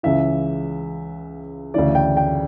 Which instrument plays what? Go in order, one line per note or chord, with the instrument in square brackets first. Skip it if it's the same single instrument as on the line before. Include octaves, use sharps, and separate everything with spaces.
[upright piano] C#2 C#3 E3 E5
D2 C#3 E3 D5
G5
G5